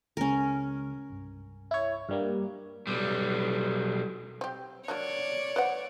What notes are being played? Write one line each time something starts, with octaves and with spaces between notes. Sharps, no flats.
C#2 C#3 G#3 C#4 A#4
C2 G2
E4 C#5
G2 G3 A#3
B1 G3
C4 G4
F#3 A#3 D4 C#5 D5
B4 C5 F#5